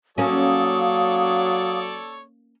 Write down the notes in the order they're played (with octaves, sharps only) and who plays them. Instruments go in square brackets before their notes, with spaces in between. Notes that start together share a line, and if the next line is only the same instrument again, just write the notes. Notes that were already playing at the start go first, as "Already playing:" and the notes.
[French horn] F#3 [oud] A#3 C#4 [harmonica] A4 C#5 D5 [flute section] F5 D#6